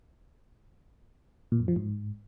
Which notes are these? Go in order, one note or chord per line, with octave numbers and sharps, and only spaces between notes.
A#2
F#2
F3
G#2